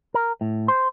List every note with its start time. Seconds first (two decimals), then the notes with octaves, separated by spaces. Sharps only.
0.14 A#4
0.41 A2
0.68 C5